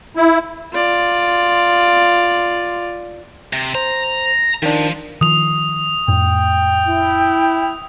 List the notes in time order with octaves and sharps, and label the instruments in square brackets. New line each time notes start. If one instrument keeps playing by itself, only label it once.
[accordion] E4
[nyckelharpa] F4 D5
[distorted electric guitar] C3
[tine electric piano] C5 [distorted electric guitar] A#5
[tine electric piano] D#3 D4 [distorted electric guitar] F3
[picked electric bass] D#3 F3 [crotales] D#6 F7
[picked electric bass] F2 A2 [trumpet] G5
[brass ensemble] E4